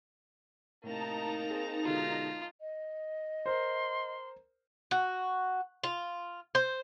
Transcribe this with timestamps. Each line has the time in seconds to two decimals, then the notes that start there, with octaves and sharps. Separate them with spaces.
0.84 A2 C3 A#3 D#4 A5 A#5 F7
1.50 C4 G#4
1.85 B2 D3 G#3 F4
2.61 D#5
3.46 A#4 C5 C6
4.91 F#4
5.84 F4
6.55 C5